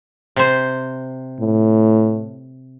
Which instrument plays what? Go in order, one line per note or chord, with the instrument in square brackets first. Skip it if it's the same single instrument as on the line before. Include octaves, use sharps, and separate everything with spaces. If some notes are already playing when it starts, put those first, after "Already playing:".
[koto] C3 C5
[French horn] A2